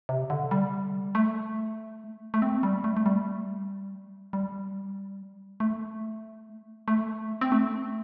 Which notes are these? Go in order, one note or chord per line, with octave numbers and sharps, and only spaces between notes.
C3
D3
G3
A3
A3
C4
G3
A3
A3
G3
G3
A3
A3
C4
A3